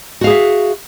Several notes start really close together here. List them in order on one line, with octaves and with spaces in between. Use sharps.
F#4 F5 G#4 E5